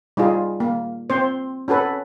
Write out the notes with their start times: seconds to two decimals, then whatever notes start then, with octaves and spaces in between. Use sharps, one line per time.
0.17 G3 D#4 F4 G#4
0.60 A#3
1.10 C4 C5
1.68 C#4 F#4 A4 B4